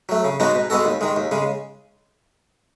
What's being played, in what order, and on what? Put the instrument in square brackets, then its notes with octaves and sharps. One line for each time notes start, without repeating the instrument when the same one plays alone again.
[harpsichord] F#3 A3
C#3
G#3 B3 D#4 F#4
B2
G#3 B3 F#4 A4
D#2
D#3 G#3
D#2
C#3 G#3